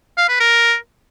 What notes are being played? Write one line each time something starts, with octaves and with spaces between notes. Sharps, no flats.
F5
B4
A#4